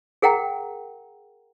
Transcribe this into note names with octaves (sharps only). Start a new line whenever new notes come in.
G#4 A#4 F#5 G5 A#5